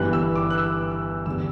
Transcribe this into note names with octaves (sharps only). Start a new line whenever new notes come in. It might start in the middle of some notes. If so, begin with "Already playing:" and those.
Already playing: G1 G2 E3 G3 F#6
E6
D6
F#6
E6
E6
E2 D3 G3 E6